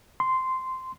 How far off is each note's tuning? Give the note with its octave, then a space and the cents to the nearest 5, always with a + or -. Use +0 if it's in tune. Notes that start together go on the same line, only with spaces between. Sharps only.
C6 -10